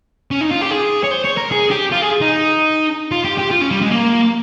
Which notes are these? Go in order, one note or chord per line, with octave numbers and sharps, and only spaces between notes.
C#4
D#4
F4
G4
G#4
C#5
C5
C#5
A#4
G#4
G4
F4
G#4
D#4
F4
G4
G4
F4
C#4
G3
G#3
A#3